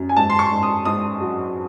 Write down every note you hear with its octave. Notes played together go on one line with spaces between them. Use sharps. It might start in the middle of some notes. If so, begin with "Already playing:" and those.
Already playing: F#2
G#5
G#2 A5
C6
C#6
G#2
D#6
G#2 D#6
F#3